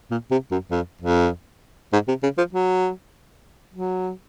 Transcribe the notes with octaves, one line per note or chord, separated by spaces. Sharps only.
A#2
C3
F#2
F2
F2
G#2
C3
C#3
F3
F#3
F#3